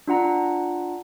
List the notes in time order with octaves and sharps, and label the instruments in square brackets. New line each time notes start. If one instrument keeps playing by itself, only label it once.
[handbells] D4 F4 F#5 A#5